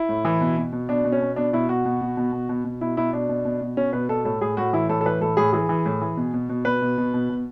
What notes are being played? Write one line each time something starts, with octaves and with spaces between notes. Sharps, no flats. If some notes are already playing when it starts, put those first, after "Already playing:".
Already playing: E4
A2
E3
B2
B2
B2
B2 D4
B2
C#4
B2
B2 D4
B2 E4
B2 F#4
B2
B2
B2
B2
B2
B2
B2 E4
B2 E4
B2 D4
B2
B2
B2
B2 C#4
B2 B4
B2 A4
A2 A4
A2 G#4
A2 F#4
E3 E4
A2 A4
A4
E3 B4
A2 A4
A2 G#4
E3 G#4
E3
A2
E3
B2
B2
B2
B2 B4
B2
B2
B2
B2